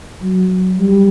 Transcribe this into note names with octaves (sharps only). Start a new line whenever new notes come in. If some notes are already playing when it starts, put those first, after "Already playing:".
F#3
G3